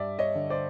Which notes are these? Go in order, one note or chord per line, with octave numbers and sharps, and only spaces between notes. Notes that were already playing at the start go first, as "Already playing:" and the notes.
Already playing: G2 D5 E5
C#5 D#5
D3
C5 D5